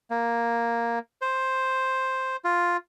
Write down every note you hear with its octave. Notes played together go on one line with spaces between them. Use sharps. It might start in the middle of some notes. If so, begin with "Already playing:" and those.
A#3
C5
F4